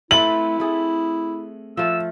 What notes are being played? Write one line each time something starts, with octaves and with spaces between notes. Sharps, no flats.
A3 C4 E4 B4 F#7
A3 G#4
F3 A3 E6